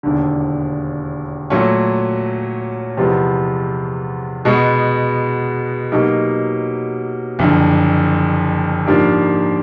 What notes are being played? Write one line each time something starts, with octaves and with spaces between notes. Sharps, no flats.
E1 D#2 D3
A#2 F#3 A3 C#4
E2 C3 F3 G#3 B3
B2 G#3 B3
B2 F#3 A#3 D#4 G4
F#1 F2 D3
G#2 F3 A#3 D4 G4